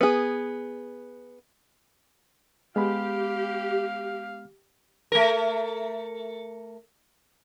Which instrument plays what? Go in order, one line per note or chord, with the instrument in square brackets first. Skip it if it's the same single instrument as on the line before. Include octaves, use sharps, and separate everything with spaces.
[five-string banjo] B3 G#4
[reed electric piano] G#3 B3 B5 [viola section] G4 [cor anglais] F5
[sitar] A3 A#4